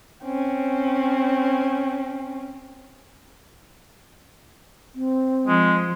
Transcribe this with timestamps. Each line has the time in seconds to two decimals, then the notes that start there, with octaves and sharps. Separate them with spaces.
0.24 C4 C#4
4.95 C4
5.48 F3 G#3